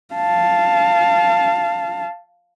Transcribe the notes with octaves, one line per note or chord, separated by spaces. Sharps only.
F5 A5